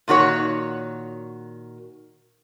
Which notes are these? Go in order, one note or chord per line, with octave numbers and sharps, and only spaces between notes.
A#2 D#3 F#4 C#5